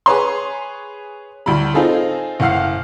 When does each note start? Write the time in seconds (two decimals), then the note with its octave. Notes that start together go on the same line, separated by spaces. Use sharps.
0.06 G#4 B4 C#5 C6
1.46 D2 A2 G3 B5
1.74 C4 D#4 F4 G#4 A4
2.40 F#1 A2 F5 F#5 F6 C7